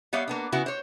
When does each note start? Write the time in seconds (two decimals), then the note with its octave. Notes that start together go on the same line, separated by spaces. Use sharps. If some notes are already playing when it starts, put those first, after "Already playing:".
0.13 G3 B3 C#5 E5 F5
0.28 A#3 B3 D4
0.52 C#3 B3 E4 F#4
0.66 C5 C#5